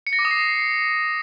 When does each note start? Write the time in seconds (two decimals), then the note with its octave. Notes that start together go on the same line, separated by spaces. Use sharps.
0.07 C#7
0.13 A#6
0.19 D6
0.25 D#6
0.31 C7